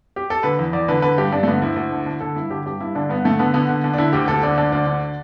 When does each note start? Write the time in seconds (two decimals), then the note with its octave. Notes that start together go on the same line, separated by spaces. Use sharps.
0.16 G4
0.30 A4
0.43 D3 B4
0.59 E2
0.73 E2 D5
0.88 D3 B4
1.02 D3 B4
1.18 G2 G4
1.32 G2 D4
1.43 A3
1.47 D3 B3
1.62 D2 E4
1.76 D2
1.92 D3
2.06 D3
2.20 D3 A4
2.36 G2 E4
2.50 D3 G4
2.66 G2 G4
2.80 G2 E4
2.95 D3 D4
3.09 G2 B3
3.24 D3 A3
3.39 D3 B3
3.54 D3 B3
3.69 D3
3.84 D3
3.94 D4
3.98 D3 E4
4.13 D2 G4
4.28 D2 A4
4.43 D3 D5
4.58 D3 D5
4.72 D2 D5
4.87 D3